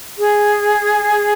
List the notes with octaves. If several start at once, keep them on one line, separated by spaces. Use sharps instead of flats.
G#4